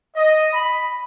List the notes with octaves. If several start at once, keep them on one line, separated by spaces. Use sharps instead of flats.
D#5
B5